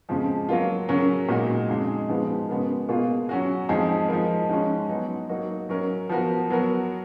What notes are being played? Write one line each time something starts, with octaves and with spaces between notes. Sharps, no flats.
F2 C#3 F3 G#3
F#3 A#3 F4
C#3 F#3 C#4 F#4 A#4
A#2 G#3 D#4 F#4
F2 C#3 G#3 D#4 G#4
G#2 F3 G#3 B3 F#4
C#3 G#3 B3 F#4 A#4
B2 A#3 F4 G#4
F#3 C#4 F#4
F2 F3 G#3 D#4 G#4
F3 G#3 D#4 A#4
G#2 F3 G#3 C#4
F#3 B3 D#4
F#3 A#3 D#4 F#4
F#3 C#4 F#4 A#4
F3 B3 F#4 A#4
F#3 B3 F#4 A#4